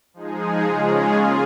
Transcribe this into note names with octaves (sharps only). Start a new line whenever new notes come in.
F3 G#3 D#4 G#4
C#3 G#3 C#4 F4 G#4
A#3 F4 G#4